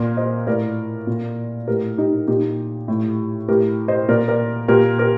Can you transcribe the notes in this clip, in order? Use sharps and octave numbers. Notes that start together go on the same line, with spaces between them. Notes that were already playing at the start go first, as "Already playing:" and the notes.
Already playing: A#2 A#4 D5
C5 D#5
A2 A#4 D5
A#2
A2 G4 A#4
D#4 G4
A#2 D#4 G4
A2
A2 G4 A#4
C5 D#5
A#2 A#4 D5
A#4 D5
A#2 G4 A#4
G4 A#4